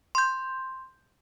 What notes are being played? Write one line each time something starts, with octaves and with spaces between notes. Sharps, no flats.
C6 G6